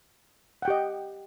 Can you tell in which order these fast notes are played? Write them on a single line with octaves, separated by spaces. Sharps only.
F#5 G5 G4 D#5